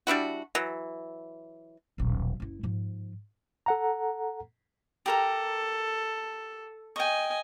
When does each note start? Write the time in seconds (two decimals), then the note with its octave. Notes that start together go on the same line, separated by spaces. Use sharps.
0.07 G3 D4 E4 F#4
0.55 E3 F#3
1.98 D#1 B1
2.40 F#1 E4
2.63 G#2 F3
3.66 A4 F#5 A#5
5.06 G4 A4 A#4 A#5
6.96 D#5 G5 G#5 C#6